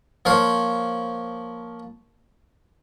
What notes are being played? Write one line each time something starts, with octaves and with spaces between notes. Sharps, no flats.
F3 A#3 C5 C#5 F5